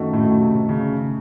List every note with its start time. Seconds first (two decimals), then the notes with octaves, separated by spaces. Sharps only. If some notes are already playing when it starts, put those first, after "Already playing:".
Already playing: F#2 D#3 A3 D#4 F#4
0.13 A2
0.41 C3
0.69 C#3